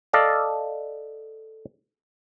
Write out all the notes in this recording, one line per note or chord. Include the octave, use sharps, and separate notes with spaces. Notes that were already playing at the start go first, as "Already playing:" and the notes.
A4 D5 D#5 F5